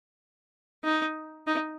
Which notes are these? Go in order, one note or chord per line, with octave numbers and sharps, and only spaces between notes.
D#4
D#4